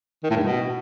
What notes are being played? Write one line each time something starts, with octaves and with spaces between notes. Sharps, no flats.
D#3
A2
G2
B2